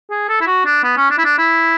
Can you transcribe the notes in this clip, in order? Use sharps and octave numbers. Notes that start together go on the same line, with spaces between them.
G#4
A4
E4
F#4
D4
B3
C#4
D4
E4
D4
E4